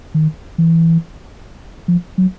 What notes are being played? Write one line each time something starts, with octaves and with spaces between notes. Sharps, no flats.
D#3
E3
F3
F#3